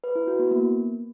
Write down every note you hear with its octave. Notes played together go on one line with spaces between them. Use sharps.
B4
E4
F#4
B3
A#3